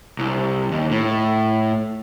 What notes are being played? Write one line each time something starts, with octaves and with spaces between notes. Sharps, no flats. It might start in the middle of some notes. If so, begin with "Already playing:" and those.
C2
D#2
A2